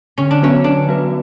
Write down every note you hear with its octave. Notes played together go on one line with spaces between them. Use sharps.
D3 C#4
D4
F#3 B3 C#4 F#4 B4
D3 D4
F#3 B3 F#4 B4